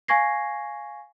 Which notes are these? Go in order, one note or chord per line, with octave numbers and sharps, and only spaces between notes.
F5 G#5 C#6 G#6 A#6 C7